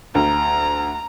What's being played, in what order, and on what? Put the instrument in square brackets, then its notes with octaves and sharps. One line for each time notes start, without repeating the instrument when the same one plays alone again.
[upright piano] D2 [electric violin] A#5